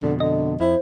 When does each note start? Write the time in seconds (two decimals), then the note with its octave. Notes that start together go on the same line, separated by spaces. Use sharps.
0.03 F2 B2 D3
0.20 D3 D#5
0.60 F2 E4 C5